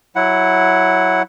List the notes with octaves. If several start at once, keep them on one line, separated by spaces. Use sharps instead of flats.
F#3 E4 F#5